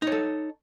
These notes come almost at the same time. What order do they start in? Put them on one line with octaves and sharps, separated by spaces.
D#4 C#5 A4